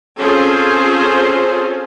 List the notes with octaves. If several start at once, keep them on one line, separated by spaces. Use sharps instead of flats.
C4 C#4 F4 G#4 A4 C5